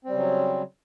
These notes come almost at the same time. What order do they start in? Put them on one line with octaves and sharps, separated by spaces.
C4 G3 C#3 F#3